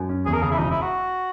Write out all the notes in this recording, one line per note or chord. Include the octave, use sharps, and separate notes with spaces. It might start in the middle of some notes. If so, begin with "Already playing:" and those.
Already playing: F#2
C#4
E2 G#4
A#4
C#3 G#4
E4
E1 D#4
E4
F#4